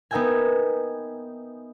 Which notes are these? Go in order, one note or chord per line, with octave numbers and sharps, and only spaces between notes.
B3 D#4 A#4 E5 G5 G#5